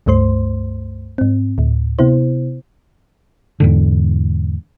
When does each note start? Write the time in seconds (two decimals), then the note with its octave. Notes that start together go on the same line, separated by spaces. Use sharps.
0.06 C#2 G2 A3 C5 C6
1.18 G#2 C4
1.58 D2 A2
1.99 C3 B3 E4 C5
3.60 E2 G#2 D3